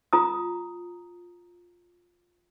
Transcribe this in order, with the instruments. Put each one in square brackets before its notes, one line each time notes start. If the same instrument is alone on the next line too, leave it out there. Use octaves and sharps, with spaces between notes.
[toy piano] F4 A#5 D#6